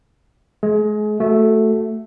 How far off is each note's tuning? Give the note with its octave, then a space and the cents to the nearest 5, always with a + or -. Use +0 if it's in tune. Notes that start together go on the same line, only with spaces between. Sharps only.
G#3 +40 G#4 +30
A3 +0 F#4 +0